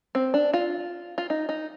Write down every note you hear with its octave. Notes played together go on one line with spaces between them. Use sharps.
C4
D4
F4
F4
D#4
D#4